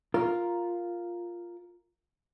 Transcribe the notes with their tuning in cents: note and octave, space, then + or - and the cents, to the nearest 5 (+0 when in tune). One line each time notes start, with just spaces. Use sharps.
F4 +0 A#4 +0